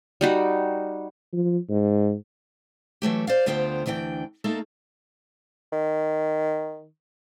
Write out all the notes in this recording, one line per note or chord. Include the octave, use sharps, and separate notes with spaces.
G3 D#4 F#4
F3
G#2
E3 F#3 A3 G4
C5 D5 F5
D2 D3 B3 F4 C5 G5
D2 E3 D4 C5 G5
A3 A#3 D#4 A4
D#3